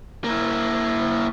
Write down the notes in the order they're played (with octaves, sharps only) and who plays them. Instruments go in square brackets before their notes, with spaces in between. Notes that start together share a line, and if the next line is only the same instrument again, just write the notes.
[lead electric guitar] A#3 E4